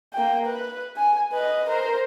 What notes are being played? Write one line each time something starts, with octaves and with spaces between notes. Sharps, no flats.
A#3 G5
B4
G#5
B4 D#5
A#4 C5